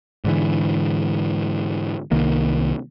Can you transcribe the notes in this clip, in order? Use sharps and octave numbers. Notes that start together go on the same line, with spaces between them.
G#2 D3 E3
C2 D#3 A#3